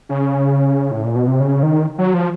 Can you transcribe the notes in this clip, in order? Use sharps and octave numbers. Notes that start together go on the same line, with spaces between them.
C#3
A2
A#2
B2
C3
C#3
D#3
F#3
F3